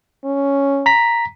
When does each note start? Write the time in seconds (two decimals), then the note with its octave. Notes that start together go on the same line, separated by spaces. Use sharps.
0.25 C#4
0.86 A#5 B6